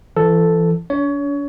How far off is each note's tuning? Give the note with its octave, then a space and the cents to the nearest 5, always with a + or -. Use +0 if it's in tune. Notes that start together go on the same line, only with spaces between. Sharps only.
E3 +35 A4 +0
D4 -45 C#5 +25